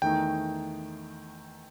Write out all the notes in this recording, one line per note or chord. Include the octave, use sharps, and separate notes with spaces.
E2 D#3 A3 D#4 G5